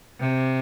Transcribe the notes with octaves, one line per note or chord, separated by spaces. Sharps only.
C3